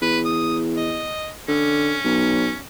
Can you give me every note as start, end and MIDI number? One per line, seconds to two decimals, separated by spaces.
0.02 1.10 40
0.02 0.19 71
0.25 0.58 87
0.77 1.30 75
1.48 1.96 50
1.48 2.59 61
2.04 2.52 35